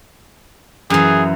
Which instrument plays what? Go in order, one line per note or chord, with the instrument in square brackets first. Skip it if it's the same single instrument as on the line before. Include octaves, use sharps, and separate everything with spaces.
[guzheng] F#2 E3 [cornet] G#4